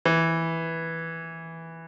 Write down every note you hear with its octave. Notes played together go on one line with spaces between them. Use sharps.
E3